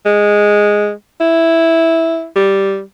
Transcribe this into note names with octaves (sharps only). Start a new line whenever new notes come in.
G#3
E4
G3